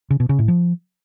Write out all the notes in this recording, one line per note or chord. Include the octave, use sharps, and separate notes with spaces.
C#3
B2
C#3
A2
F3